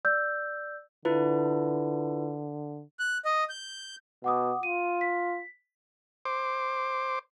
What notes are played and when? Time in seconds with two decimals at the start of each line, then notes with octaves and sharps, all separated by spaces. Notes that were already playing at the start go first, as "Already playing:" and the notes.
0.05 D5 E6 G6
1.05 D3 E4 F4 B4
2.99 F#6
3.25 D#5
3.49 G6
4.24 B2 F#5 D6 D#6
4.63 F4 D#7
5.01 B6
6.25 C5 D6